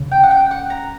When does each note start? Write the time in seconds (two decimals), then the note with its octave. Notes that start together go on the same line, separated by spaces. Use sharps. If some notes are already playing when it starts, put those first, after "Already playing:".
Already playing: C#3
0.12 G5
0.24 F#5
0.31 G5
0.51 F#5
0.70 A#5